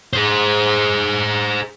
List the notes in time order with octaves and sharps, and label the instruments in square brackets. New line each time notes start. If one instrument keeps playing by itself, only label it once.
[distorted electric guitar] G#4 C5